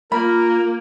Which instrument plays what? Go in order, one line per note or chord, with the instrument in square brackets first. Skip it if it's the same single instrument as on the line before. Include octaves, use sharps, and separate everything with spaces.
[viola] A#3 [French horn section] F4 [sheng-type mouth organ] A#4 [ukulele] B5